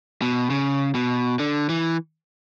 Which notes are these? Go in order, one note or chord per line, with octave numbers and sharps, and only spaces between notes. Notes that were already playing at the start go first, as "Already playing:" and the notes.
B2
C#3
B2
D3
E3